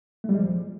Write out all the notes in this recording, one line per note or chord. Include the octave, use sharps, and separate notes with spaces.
A3
G3
G#3
F3